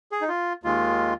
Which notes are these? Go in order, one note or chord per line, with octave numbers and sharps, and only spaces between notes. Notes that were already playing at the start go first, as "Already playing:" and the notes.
G#4
D#4
F4
D#2 D#3 G#3 F4